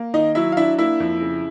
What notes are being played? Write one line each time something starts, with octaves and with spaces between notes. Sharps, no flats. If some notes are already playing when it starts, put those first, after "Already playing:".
Already playing: A#3
D#3 D#4 D#5
F#3 E4 E5
F5
D4 E4 E5
A#3 E4 E5
F2
C#3